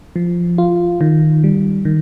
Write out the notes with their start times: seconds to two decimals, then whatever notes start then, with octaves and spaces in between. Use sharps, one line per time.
0.16 F3
0.58 F4
1.01 D#3
1.44 G3
1.85 D#3